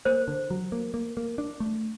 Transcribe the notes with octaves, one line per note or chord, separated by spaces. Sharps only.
A#3 C5
D3
F#3
A#3
A#3
A#3
D4
A3